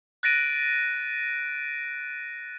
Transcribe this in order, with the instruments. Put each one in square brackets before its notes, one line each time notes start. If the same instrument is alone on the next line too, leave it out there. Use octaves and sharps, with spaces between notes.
[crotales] F#6 A6 A#6 D7 D#7